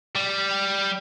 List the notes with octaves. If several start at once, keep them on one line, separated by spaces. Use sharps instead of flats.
G3